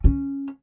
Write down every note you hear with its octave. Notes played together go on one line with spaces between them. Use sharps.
C#4